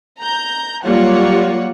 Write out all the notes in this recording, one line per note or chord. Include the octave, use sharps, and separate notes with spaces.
A#5 G6
F#3 G3 A#3 F4 C#5 F#5